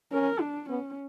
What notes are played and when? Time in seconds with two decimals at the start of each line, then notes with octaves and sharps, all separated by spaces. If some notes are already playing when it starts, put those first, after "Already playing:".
0.12 C#4 A#4
0.40 D4
0.69 B3 C#4